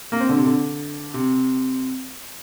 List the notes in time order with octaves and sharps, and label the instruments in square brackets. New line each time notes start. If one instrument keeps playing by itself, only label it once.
[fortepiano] A#3
C4
D3
C3
D3
C3